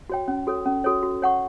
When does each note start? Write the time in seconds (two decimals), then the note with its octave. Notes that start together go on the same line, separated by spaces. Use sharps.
0.09 F#4 C#5 G5
0.28 C#4
0.47 F#4 A4 C#5
0.66 C#4
0.84 F#4 A4 C#5
1.03 F#4
1.22 C#5 F#5 C#6